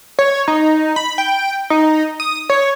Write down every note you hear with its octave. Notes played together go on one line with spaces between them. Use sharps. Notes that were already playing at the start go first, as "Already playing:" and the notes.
C#5
D#4
B5
G5
D#4
D#6
C#5